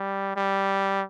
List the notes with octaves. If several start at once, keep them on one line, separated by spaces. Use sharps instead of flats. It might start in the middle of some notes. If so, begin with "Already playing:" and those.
Already playing: G3
G3